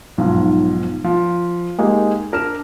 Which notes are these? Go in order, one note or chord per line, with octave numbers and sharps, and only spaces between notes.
B1 G#2 F3 F4
F3
G#3 A#3 D#4 G4
D4 A#4 F6 E7